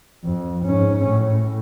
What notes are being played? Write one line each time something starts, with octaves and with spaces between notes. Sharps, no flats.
F2
G#2 C#4
A2